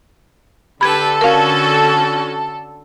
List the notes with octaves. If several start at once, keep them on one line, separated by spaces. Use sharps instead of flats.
D3 G4 A4 B4 B5 G#6
C#4 F#4 A#4 F5